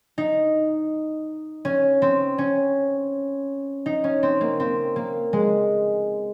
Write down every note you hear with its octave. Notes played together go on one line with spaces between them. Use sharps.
D#4
C#4
C4
C#4
D#4
C#4
C4
A#3
C4
A#3
G#3